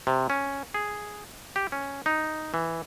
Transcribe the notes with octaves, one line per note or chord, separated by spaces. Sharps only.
C3
C#4
G#4
G4
C#4
D#4
E3